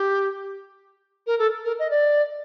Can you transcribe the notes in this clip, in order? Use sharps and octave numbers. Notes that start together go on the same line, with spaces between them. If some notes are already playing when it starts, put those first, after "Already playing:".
Already playing: G4
A#4
A4
A#4
D#5
D5